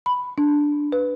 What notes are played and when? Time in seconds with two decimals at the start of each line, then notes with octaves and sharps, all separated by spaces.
0.06 B5
0.38 D4
0.92 B4